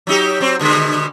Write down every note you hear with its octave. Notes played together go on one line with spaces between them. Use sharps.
F#3 D#4 G4
F#3 C4
B2 D3 G#3